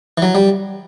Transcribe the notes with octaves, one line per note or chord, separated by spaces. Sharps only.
E3
F#3
G3